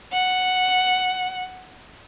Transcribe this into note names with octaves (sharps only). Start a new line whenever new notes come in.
F#5